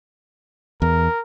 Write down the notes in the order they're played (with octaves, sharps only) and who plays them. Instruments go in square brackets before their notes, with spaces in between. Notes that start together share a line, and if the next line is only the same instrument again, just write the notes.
[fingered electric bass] E2 [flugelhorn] A#4